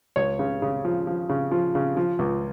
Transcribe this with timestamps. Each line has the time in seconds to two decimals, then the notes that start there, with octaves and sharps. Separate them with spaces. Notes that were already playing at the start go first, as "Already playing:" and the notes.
0.16 C#2 C#5
0.39 C#3
0.62 C#3
0.85 F3
1.07 F3
1.29 C#3
1.51 F3
1.75 C#3
1.97 F3
2.19 C#2